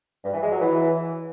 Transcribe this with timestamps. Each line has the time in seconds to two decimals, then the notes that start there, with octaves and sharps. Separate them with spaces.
0.24 G2
0.34 E3
0.43 G#3
0.52 F#3
0.61 E3